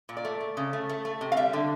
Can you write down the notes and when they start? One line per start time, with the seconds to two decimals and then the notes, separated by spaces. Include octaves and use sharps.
0.09 A#2
0.17 D5
0.25 A3
0.41 A3
0.57 C#3
0.73 A3
0.89 A3
1.05 A3
1.21 C3
1.32 F5
1.37 G3 E5
1.53 D3